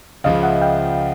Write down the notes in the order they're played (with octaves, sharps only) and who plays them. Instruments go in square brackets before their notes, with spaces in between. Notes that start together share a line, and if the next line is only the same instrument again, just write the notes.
[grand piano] C#2 C#3 F3 [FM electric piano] D#5 F5
[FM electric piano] E5 F#5
F5 G5